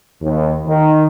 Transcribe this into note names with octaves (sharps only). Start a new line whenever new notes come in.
D#2
D#3